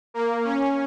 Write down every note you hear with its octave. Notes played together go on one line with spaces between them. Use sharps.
A#3
C#4